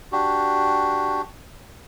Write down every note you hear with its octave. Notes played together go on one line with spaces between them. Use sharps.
D4 F#4 G4